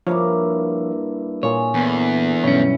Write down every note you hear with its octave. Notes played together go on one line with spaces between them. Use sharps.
G2 F3 A#3 E4 C#5 F5
A#2 A#3 F4 G#4 C#5
E2 D3 E3
B1 G2 C#4 E4 C#5